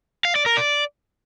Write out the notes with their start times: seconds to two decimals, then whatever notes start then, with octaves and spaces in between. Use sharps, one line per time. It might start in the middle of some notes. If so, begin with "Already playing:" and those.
0.25 F5
0.36 D5
0.46 A#4
0.57 D5